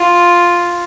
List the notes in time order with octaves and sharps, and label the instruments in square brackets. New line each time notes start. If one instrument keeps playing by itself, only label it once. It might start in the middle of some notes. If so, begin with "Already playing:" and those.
Already playing: [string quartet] F4